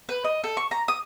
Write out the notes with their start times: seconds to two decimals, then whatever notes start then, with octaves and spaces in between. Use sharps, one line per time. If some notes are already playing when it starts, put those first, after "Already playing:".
0.09 B4
0.24 D#5
0.44 A4
0.57 C#6
0.71 A#5
0.88 D#6